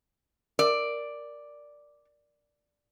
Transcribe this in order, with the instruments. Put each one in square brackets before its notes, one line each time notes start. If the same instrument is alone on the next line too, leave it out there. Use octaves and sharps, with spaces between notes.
[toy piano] A#4 [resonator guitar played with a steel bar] D5